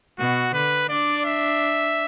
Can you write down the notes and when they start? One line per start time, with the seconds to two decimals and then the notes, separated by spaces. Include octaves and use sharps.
0.18 B2 F#4
0.53 D3 B4
0.89 D4 D5
1.25 E5